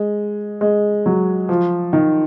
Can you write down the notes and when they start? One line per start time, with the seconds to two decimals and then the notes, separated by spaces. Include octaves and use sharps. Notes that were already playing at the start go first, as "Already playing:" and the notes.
Already playing: G#3
0.61 G#3
1.06 F#3
1.49 F3
1.93 D#3